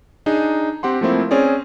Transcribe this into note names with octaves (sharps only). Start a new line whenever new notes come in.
D4 D#4 G#4
C4 G4 F#5 C6
F3 A3 A#3 C4 E4
C4 C#4 G#4 C#5 D5